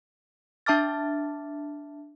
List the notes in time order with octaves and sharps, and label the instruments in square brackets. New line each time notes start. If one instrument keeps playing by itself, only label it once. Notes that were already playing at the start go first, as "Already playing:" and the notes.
[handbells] D4 E5 A5 D6 F6 A6